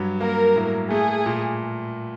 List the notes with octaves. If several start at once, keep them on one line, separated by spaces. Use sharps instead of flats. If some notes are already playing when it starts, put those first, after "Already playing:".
Already playing: G2 F#3
A#3 A#4
A2
A3 G#4
A#2